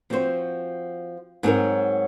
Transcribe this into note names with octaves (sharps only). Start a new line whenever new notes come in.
F3 C4 F#4 C5
G#2 F#3 C4 F#4 A#4